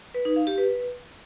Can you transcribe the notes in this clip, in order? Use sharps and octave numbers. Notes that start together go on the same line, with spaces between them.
B4
D#4
F5
G4
B4